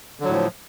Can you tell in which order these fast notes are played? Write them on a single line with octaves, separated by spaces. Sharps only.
D3 F#3 A2 F3